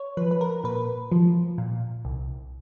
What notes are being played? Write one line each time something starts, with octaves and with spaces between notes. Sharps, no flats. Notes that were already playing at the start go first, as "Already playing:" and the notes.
Already playing: C#5
F3 B4
B4
A#4
A#2 B4
F3
A#2
C2